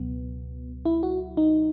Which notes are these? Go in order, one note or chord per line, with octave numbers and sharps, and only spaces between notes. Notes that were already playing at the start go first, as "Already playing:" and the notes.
Already playing: C#2 B2 F#3 B3
E4
F#4
D#4